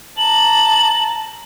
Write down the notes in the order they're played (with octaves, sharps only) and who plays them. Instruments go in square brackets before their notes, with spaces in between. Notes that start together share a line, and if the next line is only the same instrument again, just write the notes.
[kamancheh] A5 A#5 [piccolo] F#7